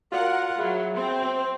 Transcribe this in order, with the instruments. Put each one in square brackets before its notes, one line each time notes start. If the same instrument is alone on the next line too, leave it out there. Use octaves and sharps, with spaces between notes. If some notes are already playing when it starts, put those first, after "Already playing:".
[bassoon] F4 [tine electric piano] F#4 D5 F5 [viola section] A#4 F#5
[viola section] F#3 [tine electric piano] G#4 E5 B5
[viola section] C4 [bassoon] C5